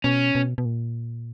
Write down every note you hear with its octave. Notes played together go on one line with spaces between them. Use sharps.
B2 C#4
B2
B2
A#2